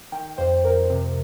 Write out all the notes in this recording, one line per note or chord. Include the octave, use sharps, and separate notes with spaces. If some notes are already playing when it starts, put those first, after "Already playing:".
D#3 G5
F2 C5
F2 A#4
C3